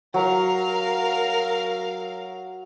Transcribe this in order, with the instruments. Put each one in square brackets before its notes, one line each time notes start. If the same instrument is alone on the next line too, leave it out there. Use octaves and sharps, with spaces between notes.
[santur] F#3 [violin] A#4 F5